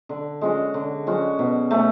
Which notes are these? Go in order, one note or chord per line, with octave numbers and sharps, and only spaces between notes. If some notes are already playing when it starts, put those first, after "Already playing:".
D3
G#3 C#4 F#4
D3
G#3 C#4 F#4
B2
A3 C#4